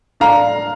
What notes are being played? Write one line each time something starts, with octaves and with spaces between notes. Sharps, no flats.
D4 F5 A#5